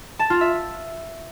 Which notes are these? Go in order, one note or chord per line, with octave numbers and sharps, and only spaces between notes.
A5
F4
E5